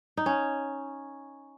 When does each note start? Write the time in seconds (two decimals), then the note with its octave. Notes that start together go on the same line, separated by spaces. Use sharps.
0.17 D#4
0.26 C#4